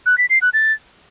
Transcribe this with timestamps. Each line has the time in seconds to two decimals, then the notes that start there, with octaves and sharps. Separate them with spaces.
0.06 F#6
0.18 B6
0.30 C7
0.42 F#6
0.54 A6